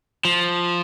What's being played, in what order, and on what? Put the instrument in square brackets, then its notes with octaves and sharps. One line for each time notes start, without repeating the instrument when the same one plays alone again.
[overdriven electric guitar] F3